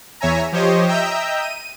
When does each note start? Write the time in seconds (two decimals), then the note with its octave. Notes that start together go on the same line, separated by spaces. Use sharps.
0.20 E2 C#5 E5 G#5 A#5
0.52 F3 G4 C5 C#5 D#5
0.87 D#5 E5 G5 A#5 E6 G6
1.42 D#7